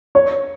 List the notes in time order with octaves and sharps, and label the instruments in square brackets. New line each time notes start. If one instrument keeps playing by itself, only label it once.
[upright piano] C#5